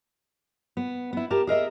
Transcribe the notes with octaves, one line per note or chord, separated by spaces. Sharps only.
B3
B3 E4
G4 A#4 A5
G#4 A#4 D#5 E5